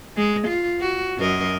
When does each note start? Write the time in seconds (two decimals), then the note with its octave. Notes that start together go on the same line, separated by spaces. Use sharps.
0.17 G#3
0.47 F4
0.80 F#4
1.18 F#2 A#4 D#5